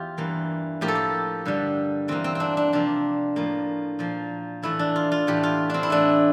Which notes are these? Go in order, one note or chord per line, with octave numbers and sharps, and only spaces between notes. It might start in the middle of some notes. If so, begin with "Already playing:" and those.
Already playing: E2 F4 G4
G2 E3 A#3
A2 F3 A#3 G4
A4
G4
G2 D3 G3
E2 E3 A#3 C4
C4
C4 D4
D4
C3 F3 A#3 D4
A2 F3 A#3
A#2 F3 A#3
A2 E3 A3 E4
D4
F4
F4
A2 E3 A3 G4
F4
C4 D4
E4
A2 E3 A3 D4